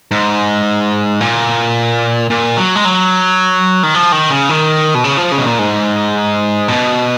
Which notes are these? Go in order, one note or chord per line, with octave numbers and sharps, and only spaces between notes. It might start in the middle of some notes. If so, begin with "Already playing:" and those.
G#2
A#2
A#2
F#3
G#3
F#3
D#3
F3
D#3
C#3
D#3
B2
C#3
F3
C#3
B2
A#2
G#2
B2